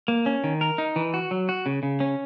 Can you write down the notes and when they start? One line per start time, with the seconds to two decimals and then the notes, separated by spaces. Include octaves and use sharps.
0.08 A#3
0.26 C#4
0.44 D#3
0.61 A#4
0.78 D#4
0.96 E3
1.14 F#4
1.31 F#3
1.49 F#4
1.66 C#3
1.83 C#3
2.00 C#4